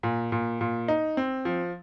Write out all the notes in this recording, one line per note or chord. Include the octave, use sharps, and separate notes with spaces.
A#2
A#2
A#2
D#4
C4
F3